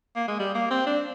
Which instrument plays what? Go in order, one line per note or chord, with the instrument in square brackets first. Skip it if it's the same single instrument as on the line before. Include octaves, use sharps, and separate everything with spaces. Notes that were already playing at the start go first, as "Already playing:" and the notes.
[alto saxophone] A#3
G#3
G3
A#3
C4
D4